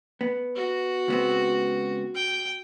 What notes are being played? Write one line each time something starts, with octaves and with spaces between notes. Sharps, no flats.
B3
F#4
C#2 B3 C4
G5